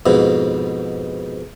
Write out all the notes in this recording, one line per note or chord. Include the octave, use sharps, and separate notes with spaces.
F2 G#2 B2